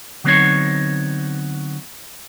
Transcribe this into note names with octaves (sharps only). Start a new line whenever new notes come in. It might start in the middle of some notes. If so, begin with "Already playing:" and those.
D3 F#3 B3 C4 D#4 C#5